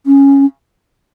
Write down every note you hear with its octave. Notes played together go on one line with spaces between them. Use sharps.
C#4